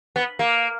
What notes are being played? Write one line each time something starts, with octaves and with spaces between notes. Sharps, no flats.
B3
A#3